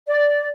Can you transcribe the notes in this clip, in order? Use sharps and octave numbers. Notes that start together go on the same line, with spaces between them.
D5